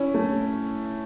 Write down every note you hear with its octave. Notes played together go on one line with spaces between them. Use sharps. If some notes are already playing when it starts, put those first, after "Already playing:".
Already playing: C#4 E4
A3